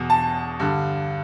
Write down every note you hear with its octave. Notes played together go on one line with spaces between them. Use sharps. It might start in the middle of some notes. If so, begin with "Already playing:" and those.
Already playing: E2 B2
A5
G2 D3